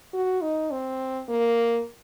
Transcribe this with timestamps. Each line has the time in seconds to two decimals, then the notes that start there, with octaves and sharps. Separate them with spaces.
0.13 F#4
0.42 D#4
0.71 C4
1.29 A#3